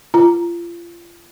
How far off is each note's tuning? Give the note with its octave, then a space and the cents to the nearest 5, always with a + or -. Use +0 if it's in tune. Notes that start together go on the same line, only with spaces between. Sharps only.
F4 -30 A#5 +0